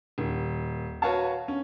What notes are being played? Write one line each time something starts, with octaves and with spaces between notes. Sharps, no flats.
D#1
F#4 B4 C#5 F5 A5
C#4